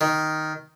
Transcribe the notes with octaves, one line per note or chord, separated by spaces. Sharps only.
D#3